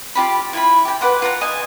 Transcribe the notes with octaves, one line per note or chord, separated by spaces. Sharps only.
F4 G4 B5
E4 F4 B5
G4 G5
B4 D5 F#5 C6
F4 F#5 A#5
D#5 F5 G#5